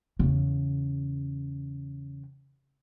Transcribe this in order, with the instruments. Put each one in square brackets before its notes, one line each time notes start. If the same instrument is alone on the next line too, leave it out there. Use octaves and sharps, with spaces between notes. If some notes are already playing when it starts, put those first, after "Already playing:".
[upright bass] E2 C#3